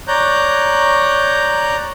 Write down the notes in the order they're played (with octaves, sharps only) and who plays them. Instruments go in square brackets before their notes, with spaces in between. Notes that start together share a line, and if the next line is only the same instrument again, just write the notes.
[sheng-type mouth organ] C#5 D5 A#5 F#6 G6